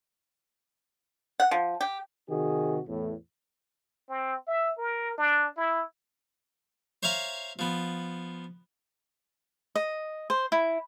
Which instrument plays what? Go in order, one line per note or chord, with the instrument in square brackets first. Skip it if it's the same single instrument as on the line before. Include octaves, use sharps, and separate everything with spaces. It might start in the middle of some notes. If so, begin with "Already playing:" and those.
[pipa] F#5
F3
G4
[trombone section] C3 D#3 F#4 G#4
E2 A2
[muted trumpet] C4
E5
A#4
D4
E4
[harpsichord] C5 C#5 E5 F5 A#5
F3 B3
[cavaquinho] D#5
C5
E4